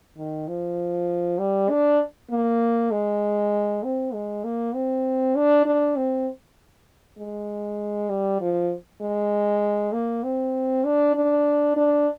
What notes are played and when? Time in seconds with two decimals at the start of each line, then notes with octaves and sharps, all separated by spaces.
0.17 D#3
0.48 F3
1.39 G3
1.70 D4
2.30 A#3
2.91 G#3
3.84 C4
4.14 G#3
4.44 A#3
4.75 C4
5.36 D4
5.66 D4
5.96 C4
7.18 G#3
8.09 G3
8.41 F3
9.01 G#3
9.93 A#3
10.24 C4
10.85 D4
11.15 D4
11.76 D4